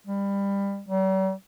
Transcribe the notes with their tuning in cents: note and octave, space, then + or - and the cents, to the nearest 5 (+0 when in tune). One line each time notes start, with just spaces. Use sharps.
G3 +25
G3 -45